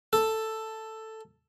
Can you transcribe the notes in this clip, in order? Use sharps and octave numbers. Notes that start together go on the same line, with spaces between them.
A4